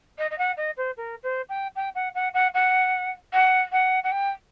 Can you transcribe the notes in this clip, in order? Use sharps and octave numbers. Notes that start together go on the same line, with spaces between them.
D#5
D#5
F#5
D#5
C5
A#4
C5
G5
G5
F#5
F#5
F#5
F#5
F#5
F#5
F#5
G5